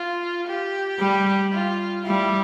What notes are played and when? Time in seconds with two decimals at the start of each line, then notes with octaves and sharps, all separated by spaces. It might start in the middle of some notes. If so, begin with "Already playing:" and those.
Already playing: F4
0.47 G4
0.99 G3
1.53 F4
2.05 G3 E4